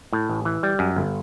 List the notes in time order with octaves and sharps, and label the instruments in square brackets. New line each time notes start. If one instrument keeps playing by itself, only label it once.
[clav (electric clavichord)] A2
A1
E3
G3
F#2
G1